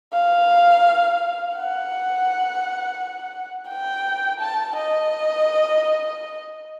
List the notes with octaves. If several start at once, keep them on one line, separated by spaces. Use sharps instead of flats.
F5
F#5
G5
A5
D#5